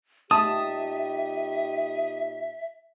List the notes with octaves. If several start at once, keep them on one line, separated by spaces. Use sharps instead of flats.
A#2 D#4 G4 E5 A5 D#6